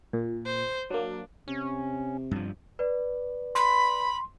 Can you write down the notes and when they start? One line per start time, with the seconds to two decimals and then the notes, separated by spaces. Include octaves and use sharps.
0.13 A#2
0.45 C5
0.90 F#3 A#3 D4
1.48 C3 C#4
2.31 G2 F3
2.79 B4 D5
3.55 B5 C6